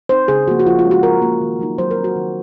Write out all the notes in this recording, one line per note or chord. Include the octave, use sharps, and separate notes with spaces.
C4 D#4 C5
C#3 G#4
F3 A#3 F#4
F#4
F3 F4
F4
G#3 C#4
F#4
F3 A#4
A#3 C#4 F4
D#3
F#3 A#3 D#4
F#3 C5
A#4
C4 D#4
F#4
D#3